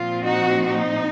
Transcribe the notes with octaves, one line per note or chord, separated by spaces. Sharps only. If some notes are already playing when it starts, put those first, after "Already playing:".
Already playing: A#2 F3 C4 F4
D#4 F#4
D#4